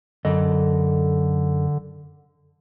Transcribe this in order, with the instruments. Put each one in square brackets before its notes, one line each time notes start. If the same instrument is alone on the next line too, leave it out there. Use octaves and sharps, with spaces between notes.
[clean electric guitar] F#2 A4 D#5 [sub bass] D3